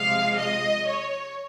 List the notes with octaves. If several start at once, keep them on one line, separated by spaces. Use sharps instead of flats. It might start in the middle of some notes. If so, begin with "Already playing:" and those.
Already playing: C3 F3 G#3 F5
D#5
C#5